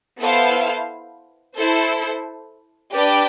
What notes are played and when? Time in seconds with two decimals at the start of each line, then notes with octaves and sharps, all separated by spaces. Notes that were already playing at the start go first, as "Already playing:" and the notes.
0.19 B3 E4 A4 C5 F5
1.56 E4 A4 C5
2.93 D4 G4 B4 D5 G5